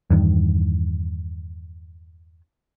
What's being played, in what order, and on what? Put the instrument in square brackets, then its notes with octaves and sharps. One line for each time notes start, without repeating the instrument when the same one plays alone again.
[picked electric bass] E2 G2 D#3